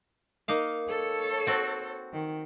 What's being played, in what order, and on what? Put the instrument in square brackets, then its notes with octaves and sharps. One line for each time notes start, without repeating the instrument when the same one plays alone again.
[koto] A#3 D#4 F5
[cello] A4 C#5
[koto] C4 F#4
[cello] D#3